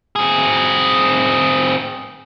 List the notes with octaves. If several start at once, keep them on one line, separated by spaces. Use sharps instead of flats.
C4 G#4